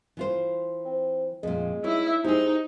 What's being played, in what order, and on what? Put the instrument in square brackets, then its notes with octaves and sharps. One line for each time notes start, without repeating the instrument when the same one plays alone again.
[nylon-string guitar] E3 F4 C5
[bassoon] C4
[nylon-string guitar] F2 A#2 [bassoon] G#3
[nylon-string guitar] D#4 C#5 [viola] E4 E5
[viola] D#4 [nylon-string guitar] G4 G#4 [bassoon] C5